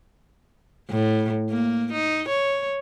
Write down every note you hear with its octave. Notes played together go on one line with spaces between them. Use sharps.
A2
A#3
D#4
C#5